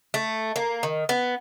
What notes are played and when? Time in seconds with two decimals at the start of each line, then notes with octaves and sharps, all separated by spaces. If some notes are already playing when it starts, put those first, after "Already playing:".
0.14 A3
0.56 A#3
0.83 D#3
1.09 B3